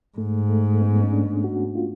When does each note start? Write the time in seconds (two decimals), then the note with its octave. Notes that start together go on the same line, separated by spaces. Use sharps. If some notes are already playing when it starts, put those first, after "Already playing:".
0.18 G#2 A3
0.49 A3
0.74 A3
0.82 B3
1.03 C#4
1.12 D4
1.44 F#4
1.76 F4